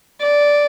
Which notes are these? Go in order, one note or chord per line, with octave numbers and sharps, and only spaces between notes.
D5